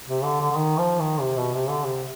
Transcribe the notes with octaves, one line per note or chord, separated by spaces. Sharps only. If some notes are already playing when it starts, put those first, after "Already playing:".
C3
D3
D3
D3
D#3
F3
D#3
C3
B2
C3
D3
C3